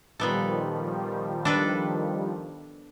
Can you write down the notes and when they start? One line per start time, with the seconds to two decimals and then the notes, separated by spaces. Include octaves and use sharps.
0.19 A#2 D#3 F3 G3 B3 A4
1.45 D4 A4 B4